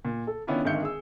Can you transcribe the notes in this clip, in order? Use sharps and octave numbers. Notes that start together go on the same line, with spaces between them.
A#2
A4
D#3 B3 C#4 D4 E4 F4
G#1 D3 D#3 E5 G6 C#7
G#4 E6